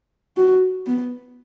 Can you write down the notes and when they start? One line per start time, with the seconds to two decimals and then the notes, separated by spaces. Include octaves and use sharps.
0.37 F#4
0.86 B3